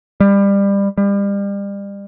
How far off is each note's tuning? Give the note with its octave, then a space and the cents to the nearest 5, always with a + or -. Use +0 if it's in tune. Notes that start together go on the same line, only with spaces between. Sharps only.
G3 +25
G3 +35